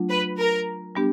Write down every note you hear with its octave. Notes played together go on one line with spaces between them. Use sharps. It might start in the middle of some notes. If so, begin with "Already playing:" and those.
Already playing: F#3 A3 D4 F4
B4
A#4
G3 B3 D4 G4